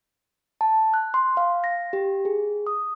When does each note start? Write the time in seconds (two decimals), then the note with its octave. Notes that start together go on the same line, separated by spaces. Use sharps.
0.61 A5
0.94 F#6
1.14 C6
1.37 F5
1.64 A#6
1.93 G4
2.25 G#4
2.67 D#6